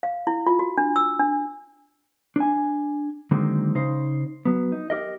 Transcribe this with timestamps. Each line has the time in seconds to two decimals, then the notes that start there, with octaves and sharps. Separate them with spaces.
0.03 F5
0.27 E4
0.47 F4
0.59 F#4
0.78 D4
0.96 E6
1.20 D4
2.36 D4 G#5
3.31 D3 D#3 F#3 G#3 A#3 C4
3.75 C#3 D#4 C5
4.45 F#3 B3
4.72 D#4
4.90 G4 A#4 D#5